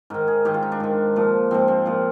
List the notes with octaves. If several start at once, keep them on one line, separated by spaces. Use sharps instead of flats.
G#2 D#3 A#4
G#4
G#2 D#3 G4
F4
D#4
D4
G#2 D#3
A#2 F3
G#2 F3 C4
C4
A#2 F3